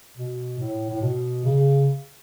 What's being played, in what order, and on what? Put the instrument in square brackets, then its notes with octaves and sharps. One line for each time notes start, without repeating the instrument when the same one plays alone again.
[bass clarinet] B2
A2
A2
B2
C#3